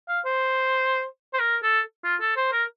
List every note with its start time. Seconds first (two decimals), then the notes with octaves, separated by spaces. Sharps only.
0.08 F5
0.25 C5
1.33 C5
1.39 A#4
1.63 A4
2.04 F4
2.21 A4
2.37 C5
2.52 A#4